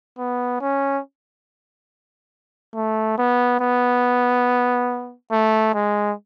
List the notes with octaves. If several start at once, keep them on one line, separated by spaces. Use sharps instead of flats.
B3
C#4
A3
B3
B3
A3
G#3